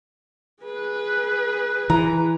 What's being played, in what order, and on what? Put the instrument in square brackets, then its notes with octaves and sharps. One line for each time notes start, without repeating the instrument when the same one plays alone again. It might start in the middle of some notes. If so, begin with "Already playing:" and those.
[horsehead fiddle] G#4 B4
[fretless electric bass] E3 [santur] A#5